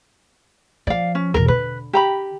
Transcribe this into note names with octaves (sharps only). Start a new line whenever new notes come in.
F3 D5 F5
C#4
E2 B2 A#4
D3 B4
G4 A#5 B5